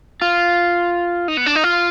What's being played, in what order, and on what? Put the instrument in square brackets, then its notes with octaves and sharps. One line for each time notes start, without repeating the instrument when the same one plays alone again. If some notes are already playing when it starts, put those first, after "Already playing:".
[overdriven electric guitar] F4
D#4
B3
D4
D#4
F4